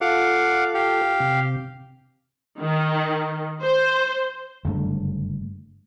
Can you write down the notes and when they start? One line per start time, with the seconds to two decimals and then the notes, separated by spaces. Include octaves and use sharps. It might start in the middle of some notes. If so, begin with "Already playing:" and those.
0.01 F4 A4 F5 F#5 D6
0.74 G4 F5
1.20 C3
2.59 D#3
3.61 C5
4.65 F#1 G2 D3 A3